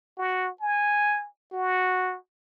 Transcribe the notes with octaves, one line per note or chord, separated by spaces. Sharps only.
F#4
G#5
F#4